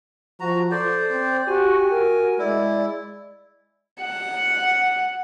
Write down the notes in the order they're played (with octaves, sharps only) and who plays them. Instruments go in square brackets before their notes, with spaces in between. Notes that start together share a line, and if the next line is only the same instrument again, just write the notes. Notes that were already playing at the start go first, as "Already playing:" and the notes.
[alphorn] F3 [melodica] F#4 A#5
[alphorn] A4 [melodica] C5 D5
[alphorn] C4
[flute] F#4 [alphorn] G4 [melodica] G#5
[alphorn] F#4 [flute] A#4
[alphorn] G#3 [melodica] E4 [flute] D5
[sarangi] F#5